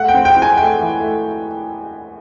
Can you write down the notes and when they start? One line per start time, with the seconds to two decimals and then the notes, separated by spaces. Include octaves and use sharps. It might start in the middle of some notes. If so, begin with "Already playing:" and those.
Already playing: A3 F#5
0.08 G5
0.14 C4
0.25 G5
0.37 C4
0.42 G#5
0.57 A3 G5
0.79 E3
1.00 A3